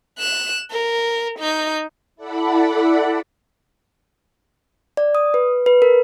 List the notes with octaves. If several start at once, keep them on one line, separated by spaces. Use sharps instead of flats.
F#6 E7
A#4
D#4 G6
E4 A4 D5 F#5 B5
D5
D#6
B4
B4
A#4